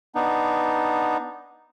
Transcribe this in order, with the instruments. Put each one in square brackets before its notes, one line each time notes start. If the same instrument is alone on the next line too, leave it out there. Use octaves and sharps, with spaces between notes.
[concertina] B3 D4 D#4